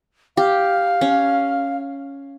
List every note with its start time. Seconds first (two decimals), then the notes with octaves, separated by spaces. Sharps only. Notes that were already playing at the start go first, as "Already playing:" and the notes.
0.37 G4 F5
1.01 C#4